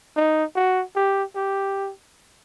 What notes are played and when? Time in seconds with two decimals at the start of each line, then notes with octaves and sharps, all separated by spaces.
0.16 D#4
0.56 F#4
0.96 G4
1.36 G4